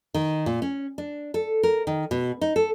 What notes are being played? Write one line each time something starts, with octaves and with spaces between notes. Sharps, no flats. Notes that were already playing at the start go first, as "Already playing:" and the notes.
D#3
A#2
C#4
D4
A4
A#4
D#3
B2
D#4
A4